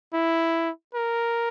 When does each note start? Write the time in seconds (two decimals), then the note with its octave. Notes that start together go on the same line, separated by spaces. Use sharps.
0.13 E4
0.95 A#4